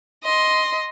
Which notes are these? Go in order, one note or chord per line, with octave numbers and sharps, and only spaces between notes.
D#5 C6